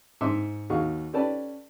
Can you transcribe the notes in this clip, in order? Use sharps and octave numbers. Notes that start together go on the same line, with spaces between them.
G#2 E5 C6 D6 E6
D#2 F#4 G#4 D#5 F5 C#6
C#4 G4 A4 B4 D5 A5